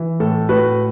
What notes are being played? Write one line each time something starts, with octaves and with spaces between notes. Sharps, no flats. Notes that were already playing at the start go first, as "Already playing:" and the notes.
Already playing: E3
A2 A4
A2 F#4 B4